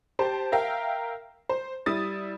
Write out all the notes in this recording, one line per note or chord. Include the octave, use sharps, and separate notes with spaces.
G4 C5 A5
A#4 E5 F5 G5
C5
G3 E4 D#6 A6